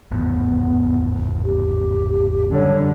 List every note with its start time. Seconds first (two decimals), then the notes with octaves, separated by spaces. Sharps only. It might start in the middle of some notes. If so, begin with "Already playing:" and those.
0.11 G#1 E2 A2 B3
1.44 G4
2.53 F#2 D3 G3 C#5